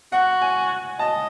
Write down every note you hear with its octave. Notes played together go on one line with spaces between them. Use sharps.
F#4 F#5
G#5
D#5 A5